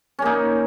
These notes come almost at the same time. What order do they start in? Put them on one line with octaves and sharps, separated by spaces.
C#4 A#3 D#4